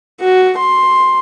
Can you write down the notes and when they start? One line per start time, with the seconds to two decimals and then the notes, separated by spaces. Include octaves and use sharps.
0.21 F#4
0.58 C6